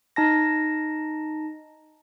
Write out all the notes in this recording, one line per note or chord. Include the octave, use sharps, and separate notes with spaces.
D#4 A5 A#6